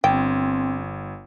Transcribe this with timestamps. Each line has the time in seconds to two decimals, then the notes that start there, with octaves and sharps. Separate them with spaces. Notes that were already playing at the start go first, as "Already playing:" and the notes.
0.04 G1 C4 G5